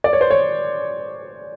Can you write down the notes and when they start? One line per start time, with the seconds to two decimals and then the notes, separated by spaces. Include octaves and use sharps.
0.04 D5
0.13 C#5
0.21 C5
0.30 C#5